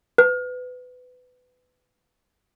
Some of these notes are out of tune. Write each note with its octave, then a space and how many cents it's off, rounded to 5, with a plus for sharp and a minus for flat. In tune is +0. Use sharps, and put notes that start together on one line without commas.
B4 +25